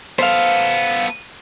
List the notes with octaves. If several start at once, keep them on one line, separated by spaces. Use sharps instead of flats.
B3 A4 C5 F5